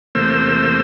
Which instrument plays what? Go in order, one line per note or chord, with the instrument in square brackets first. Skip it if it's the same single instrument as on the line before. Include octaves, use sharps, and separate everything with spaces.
[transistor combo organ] E2 C3 A3 A#3 C5 E6